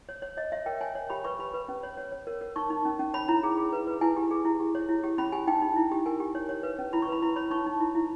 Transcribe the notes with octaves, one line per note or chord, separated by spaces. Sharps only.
C#5
C#5
C#5 D#5
C#5 E5
A#4 G5
C#5 G#5
C#5
G4 B5
B4 C#6
G4 B5
B4
C#4
C#5
C#5
C#5
A#4
A#4
D#4 C#6
D#4
C#4
C#4
C#5 B5
E4 A#5
G#4
G#4
B4
B4
E4 G#5
G4
G#4
E4
G4
C#5
E4
G4
C#4 B5
G4 G#5
D#4 G5
D#4
E4
G4
A#4 G#5
G4
C#5
C#5
B4
C#4
E4 B5
C#6
B4 B5
E4 B5
C#5 B5
D#4 C#6
D#4
E4
E4